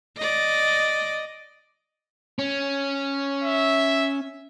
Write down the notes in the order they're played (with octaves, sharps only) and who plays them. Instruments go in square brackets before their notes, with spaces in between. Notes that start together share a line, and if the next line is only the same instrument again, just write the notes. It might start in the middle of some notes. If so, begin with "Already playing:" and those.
[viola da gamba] D5 D#5
[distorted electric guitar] C#4
[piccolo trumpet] E5